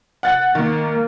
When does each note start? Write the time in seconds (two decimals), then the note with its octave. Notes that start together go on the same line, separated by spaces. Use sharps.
0.23 F#5 F#6 A6
0.55 D#3 A#3